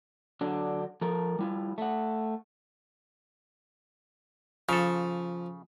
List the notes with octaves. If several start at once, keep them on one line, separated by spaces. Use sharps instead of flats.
D3 F#3 D4
F3 A4 A#4
G3 E4 F4
A3 F#5
C#3 F3 A4